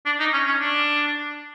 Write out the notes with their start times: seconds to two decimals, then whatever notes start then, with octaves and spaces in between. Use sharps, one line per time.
0.06 D4
0.19 D#4
0.33 C#4
0.47 C#4
0.60 D4